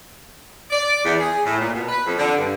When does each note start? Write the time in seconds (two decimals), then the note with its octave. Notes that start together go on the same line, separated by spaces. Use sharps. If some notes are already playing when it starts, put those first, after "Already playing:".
0.71 D5
1.03 E2
1.19 G#4
1.44 A2
1.60 A#2
1.73 B2
1.88 B4
2.05 F2
2.18 D3
2.37 G2